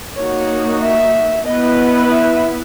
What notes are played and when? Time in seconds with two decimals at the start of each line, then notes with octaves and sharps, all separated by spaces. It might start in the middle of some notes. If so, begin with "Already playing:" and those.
0.16 A#3 D#4 F#4 C#5
0.81 E5
1.46 B3 E4 B4 D#5
2.11 E5